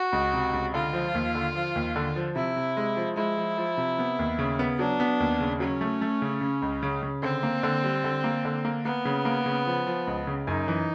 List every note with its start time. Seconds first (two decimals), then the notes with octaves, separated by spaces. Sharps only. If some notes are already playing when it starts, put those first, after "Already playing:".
Already playing: F#4
0.13 C#2
0.33 C3
0.54 C#2
0.74 D3 F4
0.93 F3
1.14 D#2
1.35 D3
1.55 F3
1.75 D#2
1.96 D3
2.16 F3
2.36 C3 E4
2.56 C3
2.77 G#3
2.97 F3
3.17 G#3 E4
3.37 F3
3.58 F3
3.77 C3
3.99 B3
4.19 D#2
4.39 C#3
4.59 B3
4.79 F#3 D4
5.00 B3
5.20 D#2
5.40 C#3
5.60 F#3 C#4
5.81 A3
6.01 A3
6.22 C#3
6.41 C#3
6.62 C#2
6.83 C#3
7.03 C#3
7.23 D3 C4
7.43 A#3
7.63 D3
7.84 G3
8.04 D3
8.24 A#3
8.45 D3
8.65 A#3
8.85 A#3 B3
9.05 C#3
9.25 A#3
9.46 C#3
9.66 F3
9.87 F3
10.07 C#2
10.27 C#3
10.47 F#2 D#4
10.68 E3